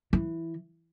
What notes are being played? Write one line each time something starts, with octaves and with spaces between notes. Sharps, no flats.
E3